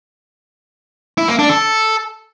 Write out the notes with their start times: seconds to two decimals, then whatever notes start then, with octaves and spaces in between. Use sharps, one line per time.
1.18 E4
1.28 A#3
1.39 D4
1.49 A4